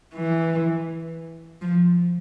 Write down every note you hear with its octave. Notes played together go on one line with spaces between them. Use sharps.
E3
F3